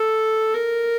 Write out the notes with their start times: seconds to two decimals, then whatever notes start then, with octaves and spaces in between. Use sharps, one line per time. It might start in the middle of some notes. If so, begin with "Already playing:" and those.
Already playing: A4
0.54 A#4